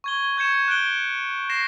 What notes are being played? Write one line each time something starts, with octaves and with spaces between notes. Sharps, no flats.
C#6 G#6 G7
C#6 G6 G#6 C#7 E7
F#6 G6 D7 G7
A#6 C7 E7